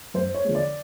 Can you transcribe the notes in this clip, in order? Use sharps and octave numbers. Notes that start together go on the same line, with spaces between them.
F#2 C5
C#5
D3 F3 G#3
D5